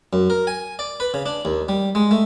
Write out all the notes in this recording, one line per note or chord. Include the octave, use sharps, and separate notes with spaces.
F#2
A#4
G#5
D5
B4
C#3
D4
D#2
G3
G#3
A3